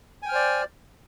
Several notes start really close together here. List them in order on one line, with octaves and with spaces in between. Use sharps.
G#5 G5 F6 C5 D5